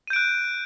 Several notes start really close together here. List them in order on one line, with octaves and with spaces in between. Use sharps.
D#7 G6 D7 F#6